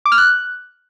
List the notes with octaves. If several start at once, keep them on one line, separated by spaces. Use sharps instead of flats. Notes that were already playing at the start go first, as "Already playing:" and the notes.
D6
F6
F#6